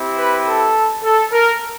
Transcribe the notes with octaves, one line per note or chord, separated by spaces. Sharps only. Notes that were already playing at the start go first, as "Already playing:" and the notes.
Already playing: C4 E4 G4
B4
A4
A4
A#4